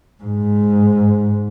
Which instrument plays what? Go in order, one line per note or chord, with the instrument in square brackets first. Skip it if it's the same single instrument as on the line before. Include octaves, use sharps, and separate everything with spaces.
[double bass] G#2